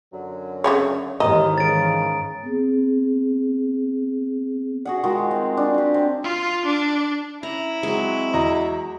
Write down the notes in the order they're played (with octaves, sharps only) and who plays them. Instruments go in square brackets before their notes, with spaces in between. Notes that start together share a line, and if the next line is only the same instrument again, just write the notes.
[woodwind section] F#2 D3 F#3
[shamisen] C#3 A3 C#5
[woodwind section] D#2 [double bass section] G#2 D#3 E3 [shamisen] D#5 [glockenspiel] A#5 D#6
[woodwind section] C#3 [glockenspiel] A6 D7
[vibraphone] B3 C4 G#4
[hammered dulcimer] F#4 G#4 F#5
D#3 G#3 F4 F#4
C4
D4
G4 F#5
C4
[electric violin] F4
D4
[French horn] C#4 [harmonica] E4 [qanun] A#5
[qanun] F#3 G#3 [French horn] C4
[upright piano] E2 D#5 A#5 [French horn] F#4